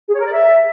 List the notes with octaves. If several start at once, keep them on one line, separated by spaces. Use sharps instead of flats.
G#4
C#5
A#4
D5
E5